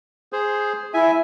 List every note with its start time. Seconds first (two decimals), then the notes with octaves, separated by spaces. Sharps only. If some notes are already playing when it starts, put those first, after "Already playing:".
0.33 G#4 C5
0.94 E4 E5 G#5